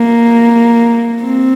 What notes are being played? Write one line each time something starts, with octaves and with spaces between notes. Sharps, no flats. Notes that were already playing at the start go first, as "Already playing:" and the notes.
Already playing: A#3
C4